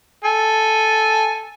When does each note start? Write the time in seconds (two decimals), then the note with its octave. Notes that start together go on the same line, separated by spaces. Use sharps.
0.25 A4 G#5